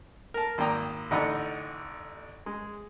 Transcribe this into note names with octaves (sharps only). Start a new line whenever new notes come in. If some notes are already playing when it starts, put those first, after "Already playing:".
A#4 A5
G#1 A#3 D5 G5 A#5 D#6
A1 D3 D#4 D#5 F#5 B5
G#3